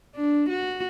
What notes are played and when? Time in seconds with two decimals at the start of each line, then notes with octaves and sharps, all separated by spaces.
0.15 D4
0.49 F#4